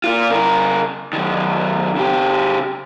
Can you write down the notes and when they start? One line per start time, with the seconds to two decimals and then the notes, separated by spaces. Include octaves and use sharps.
0.04 A#3 F4
0.30 C#3 A#4
1.13 F#2 D#3
1.96 C#3 G4